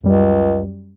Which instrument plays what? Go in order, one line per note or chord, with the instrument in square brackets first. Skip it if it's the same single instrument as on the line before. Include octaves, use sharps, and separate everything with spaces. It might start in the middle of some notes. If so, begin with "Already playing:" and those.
[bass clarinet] C#2 [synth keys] F#2 G3